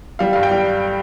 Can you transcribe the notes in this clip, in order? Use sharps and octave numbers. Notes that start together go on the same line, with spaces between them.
G3 F5
G2 F5
G5
G3